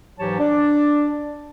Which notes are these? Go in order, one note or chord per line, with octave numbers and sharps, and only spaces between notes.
G#2 E3 F#3 G4 C#5 A5
D4 D5